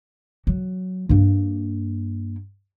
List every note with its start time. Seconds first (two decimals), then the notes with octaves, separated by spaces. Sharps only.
0.47 F#3
1.09 G2 A#3